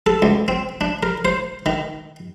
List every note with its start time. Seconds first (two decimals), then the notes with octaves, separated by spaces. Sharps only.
0.06 A4
0.22 C#2
0.48 C4
0.81 D4
1.03 A#4
1.25 C5
1.66 D#3